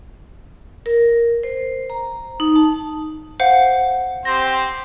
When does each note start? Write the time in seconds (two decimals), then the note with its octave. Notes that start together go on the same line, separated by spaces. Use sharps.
0.86 A#4
1.43 C5
1.90 A#5
2.40 D#4
2.56 A5
3.40 C5 F5 F#5
4.25 C4 G4 C5 A#6